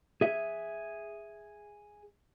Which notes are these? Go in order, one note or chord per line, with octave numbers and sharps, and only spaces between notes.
G#4 E5